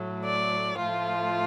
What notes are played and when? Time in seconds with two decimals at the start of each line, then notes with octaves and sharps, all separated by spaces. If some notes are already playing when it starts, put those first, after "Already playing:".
Already playing: A2 F#3 A3
0.24 D5
0.78 A2 F3 A3 F4